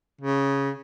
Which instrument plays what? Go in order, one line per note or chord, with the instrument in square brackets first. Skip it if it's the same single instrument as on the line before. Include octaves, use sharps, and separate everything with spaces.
[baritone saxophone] C#3